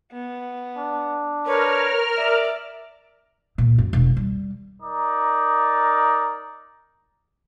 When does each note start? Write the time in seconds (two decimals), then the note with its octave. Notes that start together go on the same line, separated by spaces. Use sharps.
0.12 B3
0.77 D4
1.46 A#4 B4 C#5 F6
2.16 D5 E5
3.58 A#2
3.78 F#2
3.93 E1
4.17 G3
4.82 D#4 A#4 D5